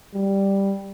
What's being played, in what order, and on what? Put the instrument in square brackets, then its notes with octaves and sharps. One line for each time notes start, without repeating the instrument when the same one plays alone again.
[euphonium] G3